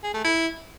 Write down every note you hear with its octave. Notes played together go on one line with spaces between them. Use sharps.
G#4
A3
E4